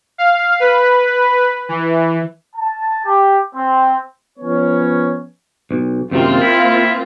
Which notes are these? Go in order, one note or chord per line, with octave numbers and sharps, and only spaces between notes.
F5
B4
E3
A5
G4
C4
F3 B3 C#4 C#5
B1
F#2 C3 D#3 A#3 C4 F4
E4